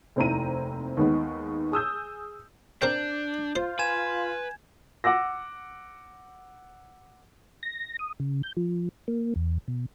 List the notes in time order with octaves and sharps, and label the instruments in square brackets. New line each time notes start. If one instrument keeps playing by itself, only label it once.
[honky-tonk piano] F1 D#2 C4 E4 A#5 D#7
D#2 D#3 G#3 B3
G#4 D#6 E6 G6
[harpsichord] C4 A#4 C5 [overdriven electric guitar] D4 [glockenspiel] G6
[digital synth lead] F4 [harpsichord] C5
[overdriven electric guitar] B4 [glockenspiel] G#5 G#6 E7
[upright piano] F#5 D6 E6 A#6
[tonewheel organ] A#6
D#6
C#3
G6
F3
A#3
E2
B2